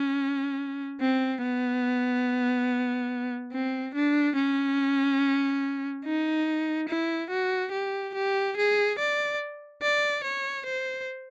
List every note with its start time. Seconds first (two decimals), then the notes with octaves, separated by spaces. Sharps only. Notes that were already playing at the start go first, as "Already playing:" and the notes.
Already playing: C#4
1.01 C4
1.42 B3
3.52 C4
3.94 D4
4.36 C#4
6.05 D#4
6.89 E4
7.30 F#4
7.72 G4
8.15 G4
8.57 G#4
8.99 D5
9.82 D5
10.24 C#5
10.66 C5